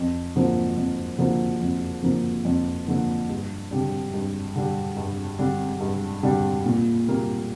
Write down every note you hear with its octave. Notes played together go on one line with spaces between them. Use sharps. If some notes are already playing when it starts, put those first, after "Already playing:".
Already playing: F2
D3 F3 A#3
F2
D3 F3 A#3
F2
D3 F3 A#3
F2
D3 F3 A#3
G2
D3 G3 D4
G2
D3 G3 D4
G2
D3 G3 D4
G2
D3 G3 D4
A#2
G3 A#3